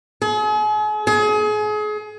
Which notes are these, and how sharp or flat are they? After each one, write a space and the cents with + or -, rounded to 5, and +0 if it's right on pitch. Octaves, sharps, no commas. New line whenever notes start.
G#4 +40
G#4 +30